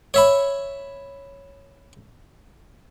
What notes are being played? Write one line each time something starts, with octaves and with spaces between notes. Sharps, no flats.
C#5 E5 B5